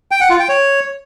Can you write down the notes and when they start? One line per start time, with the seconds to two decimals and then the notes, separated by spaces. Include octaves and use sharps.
0.11 G5
0.21 F#5
0.30 F4
0.40 G5
0.49 C#5